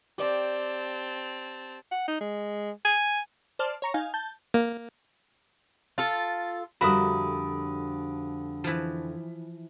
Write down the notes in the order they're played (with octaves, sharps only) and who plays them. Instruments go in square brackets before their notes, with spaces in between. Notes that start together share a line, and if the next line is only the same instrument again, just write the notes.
[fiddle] C4 A5 [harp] G4 D5
[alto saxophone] F#5
D#4
G#3
G#5
[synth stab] C5 D5 A5 F6
C#5 A#5 C#6
D#4 F5 G#5
A5 G6
[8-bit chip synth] A#3
[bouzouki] F4 A4
[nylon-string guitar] F2 D3 G3 [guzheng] F#4 A#4 E5 [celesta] B5 D#6
[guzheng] E3 F3